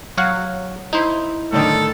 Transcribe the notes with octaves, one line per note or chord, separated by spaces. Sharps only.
F#3 C#5 F5 F#5
D#4 E4 C5
A2 D3 D#3 A4